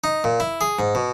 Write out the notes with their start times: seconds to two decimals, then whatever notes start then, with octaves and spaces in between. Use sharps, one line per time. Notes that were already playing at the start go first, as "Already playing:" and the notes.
0.04 D#4
0.24 A#2
0.40 E4
0.61 G#4
0.79 G#2
0.95 B2